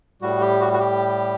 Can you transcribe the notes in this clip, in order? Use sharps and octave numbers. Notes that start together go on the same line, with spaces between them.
A2 G3 F#4
G4
F#4
F#4
G4